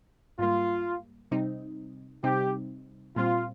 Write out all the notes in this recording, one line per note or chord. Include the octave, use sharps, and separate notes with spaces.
G#2 G3 A#3 F4
C3 G3 C4 D#4
C3 G3 C4 D#4 G4
A#2 G3 C4 F4